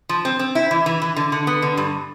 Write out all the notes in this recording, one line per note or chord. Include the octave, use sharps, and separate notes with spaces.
F3
C4
C4
E4
E3
E3
E3
D3
D3
B3
D3
G2